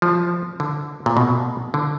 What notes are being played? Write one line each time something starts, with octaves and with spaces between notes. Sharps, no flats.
F3
D3
A#2
B2
D3